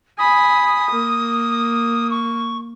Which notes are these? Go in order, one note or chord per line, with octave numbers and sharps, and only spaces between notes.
G#5 B5 D#6
A#3
C#6